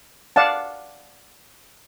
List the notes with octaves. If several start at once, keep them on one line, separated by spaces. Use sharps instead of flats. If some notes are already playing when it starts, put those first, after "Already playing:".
D5 F5 F#5 A5